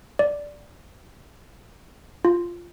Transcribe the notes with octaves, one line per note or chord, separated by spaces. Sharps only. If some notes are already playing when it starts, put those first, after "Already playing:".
D5
F4